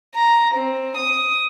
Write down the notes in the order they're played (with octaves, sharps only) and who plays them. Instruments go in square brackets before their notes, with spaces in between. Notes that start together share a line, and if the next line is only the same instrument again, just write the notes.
[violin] A#5
C4
D#6